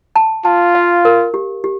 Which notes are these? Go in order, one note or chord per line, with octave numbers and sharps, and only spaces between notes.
A5
F4 A5
F5
A#4
G4
G4